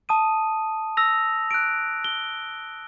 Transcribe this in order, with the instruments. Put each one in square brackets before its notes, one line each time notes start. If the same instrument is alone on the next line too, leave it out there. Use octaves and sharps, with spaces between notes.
[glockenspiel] A5 D#6 D#7
E6 A#6 F7
F#6 D7
G7